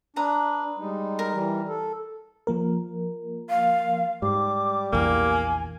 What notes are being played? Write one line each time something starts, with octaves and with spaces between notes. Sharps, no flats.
D4 B4 A#5 D#6
G3 G#3 D#4
A#4
E3 G3
A4
F3 A#3 A#4
F5
G#2 G3 D6
A#1 E2 A#3 G#5